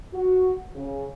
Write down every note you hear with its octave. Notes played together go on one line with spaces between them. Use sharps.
F#4
C#3